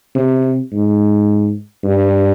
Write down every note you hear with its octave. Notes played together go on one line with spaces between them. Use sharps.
C3
G#2
G2